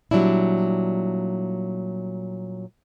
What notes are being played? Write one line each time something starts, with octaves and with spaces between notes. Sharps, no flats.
A#2 F#3 G3 D4 E4